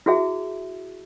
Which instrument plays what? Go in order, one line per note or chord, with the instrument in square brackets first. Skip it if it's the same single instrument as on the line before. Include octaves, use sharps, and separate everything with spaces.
[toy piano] E4 F#4 G#4 E5